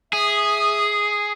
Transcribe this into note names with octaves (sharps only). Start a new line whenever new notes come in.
G#4 E5 D#6